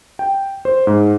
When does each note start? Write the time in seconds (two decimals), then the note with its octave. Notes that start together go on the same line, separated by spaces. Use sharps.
0.19 G5
0.65 C5
0.87 G#2